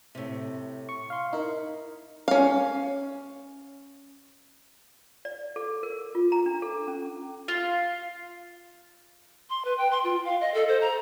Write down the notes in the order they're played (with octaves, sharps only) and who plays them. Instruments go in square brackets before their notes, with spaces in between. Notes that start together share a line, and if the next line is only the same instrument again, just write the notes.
[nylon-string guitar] A2 C3
[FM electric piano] C#6
F5 C6
[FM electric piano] D#4 A#4 [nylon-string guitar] E4
[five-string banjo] C#4 F5
[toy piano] D5
A4
A#4
F4
A#5
D4
A4
C#4
[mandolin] F4
[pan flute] C6
B4
G5
C6
F4
F5
D#5
A4
C5
A#5